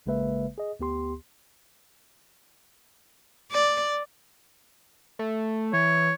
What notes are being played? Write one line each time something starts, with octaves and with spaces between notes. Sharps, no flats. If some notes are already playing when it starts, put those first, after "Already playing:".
A1 C#3 G#3 A#3 B4 E5
G#4 D#5
D2 B3 G4 C6
D5
A3
E3 C#5